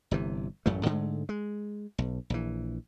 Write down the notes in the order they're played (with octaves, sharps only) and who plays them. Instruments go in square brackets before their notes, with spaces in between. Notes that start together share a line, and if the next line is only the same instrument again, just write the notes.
[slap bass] G1 C3 E3
A1 F#2 A2 A3
G#2 D3 G#3 A3
G#3
B1
A#1 E3